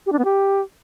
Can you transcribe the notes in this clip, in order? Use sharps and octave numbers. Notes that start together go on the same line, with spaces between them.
G4
D4
B3
G4